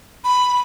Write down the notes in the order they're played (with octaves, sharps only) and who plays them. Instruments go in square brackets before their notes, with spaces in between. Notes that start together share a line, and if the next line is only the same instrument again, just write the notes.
[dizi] B5